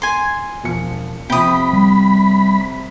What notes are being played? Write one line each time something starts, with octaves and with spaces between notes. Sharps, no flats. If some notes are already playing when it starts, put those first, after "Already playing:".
G#5 C6
E1 F3 C#7
C3 F3 G5 B5 D#6
G3